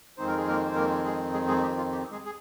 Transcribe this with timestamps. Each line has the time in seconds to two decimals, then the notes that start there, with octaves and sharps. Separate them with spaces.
0.17 F2 D#3 G#3 C4 D#4 C5
0.27 A#4
0.37 G#4
0.48 A#3 A#4
0.66 C5
0.76 A#3 A#4
1.04 G#3 G#4
1.33 G#3 G#4
1.48 G#3 G#4
1.62 G4
1.77 F4
1.92 G4
2.11 G#3 G#4
2.25 G#4